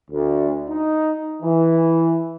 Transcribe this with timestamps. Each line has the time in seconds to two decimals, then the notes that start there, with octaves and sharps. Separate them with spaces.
0.11 D2
0.67 D#4
1.43 E3